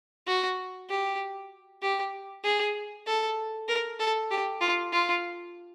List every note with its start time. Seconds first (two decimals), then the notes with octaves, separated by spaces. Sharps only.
0.27 F#4
0.90 G4
1.82 G4
2.44 G#4
3.06 A4
3.68 A#4
3.99 A4
4.31 G4
4.61 F4
4.92 F4